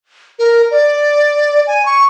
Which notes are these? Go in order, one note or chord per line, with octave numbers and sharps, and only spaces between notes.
A#4
D5
G#5
C#6